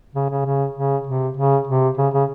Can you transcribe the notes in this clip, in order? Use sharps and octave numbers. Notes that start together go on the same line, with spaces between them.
C#3
C#3
C#3
C#3
C3
C#3
C3
C#3
C#3